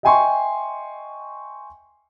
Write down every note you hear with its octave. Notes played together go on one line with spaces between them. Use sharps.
D#5 E5 G5 G#5 C6 C#6